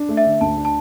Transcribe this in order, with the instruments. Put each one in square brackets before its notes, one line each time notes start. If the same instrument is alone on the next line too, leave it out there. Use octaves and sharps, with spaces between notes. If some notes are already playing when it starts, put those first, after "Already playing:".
Already playing: [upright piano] D4
A3
[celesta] E5
[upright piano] D3
[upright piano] D2 [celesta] A5
[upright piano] D4
[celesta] A5